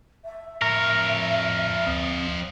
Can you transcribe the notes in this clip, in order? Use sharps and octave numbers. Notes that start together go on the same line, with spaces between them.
E5
F2 A2 A#4 C#5
D2 C4 D#6